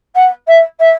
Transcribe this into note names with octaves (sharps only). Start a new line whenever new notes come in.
F#5
E5
E5